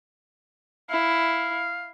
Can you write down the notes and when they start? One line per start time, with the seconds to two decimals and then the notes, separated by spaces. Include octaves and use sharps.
0.90 E4 F5